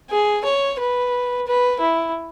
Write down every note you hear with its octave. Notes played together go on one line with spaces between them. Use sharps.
G#4
C#5
B4
B4
E4